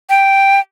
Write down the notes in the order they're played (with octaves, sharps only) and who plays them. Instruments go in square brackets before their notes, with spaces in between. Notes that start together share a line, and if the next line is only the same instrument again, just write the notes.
[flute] G5